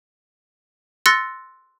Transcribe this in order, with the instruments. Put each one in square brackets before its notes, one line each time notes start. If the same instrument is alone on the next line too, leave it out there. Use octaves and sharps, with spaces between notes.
[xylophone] C6 E6 F#6 A6 A#6 C#7